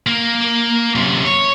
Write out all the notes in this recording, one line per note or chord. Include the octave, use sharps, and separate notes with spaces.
A#3
F#2 C3
C#5